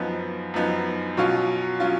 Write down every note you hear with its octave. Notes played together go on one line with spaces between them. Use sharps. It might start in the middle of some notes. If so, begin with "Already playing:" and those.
Already playing: F#2 F3 B3 D#4
F#2 F3 B3 D#4
B2 F#3 C#4 F4
F#3 C#4 F4